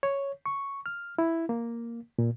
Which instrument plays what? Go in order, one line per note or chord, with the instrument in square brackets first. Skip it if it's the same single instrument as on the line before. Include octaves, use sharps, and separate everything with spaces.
[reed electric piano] C#5
C#6
F6
E4
A#3
A#2